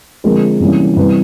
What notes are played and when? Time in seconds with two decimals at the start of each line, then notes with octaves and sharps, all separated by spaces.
0.24 D3 F3 G#3 C4 A#4
0.60 C3 E3 G3 A#3 C#4
0.97 C3 E3 G3 B4